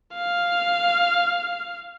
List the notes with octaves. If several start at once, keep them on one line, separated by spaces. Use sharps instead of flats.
F5